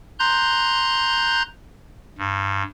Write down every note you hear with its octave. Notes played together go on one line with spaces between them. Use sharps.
A#5 C6 F#6 G6
G2